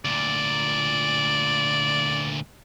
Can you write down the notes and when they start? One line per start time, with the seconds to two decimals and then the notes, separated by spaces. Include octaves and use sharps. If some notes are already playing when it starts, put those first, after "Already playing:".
0.05 D2 A#2 D5